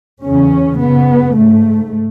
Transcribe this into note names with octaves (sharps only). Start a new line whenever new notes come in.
E2 C#3 C#4
F#2 C#3 B3
G#2 A3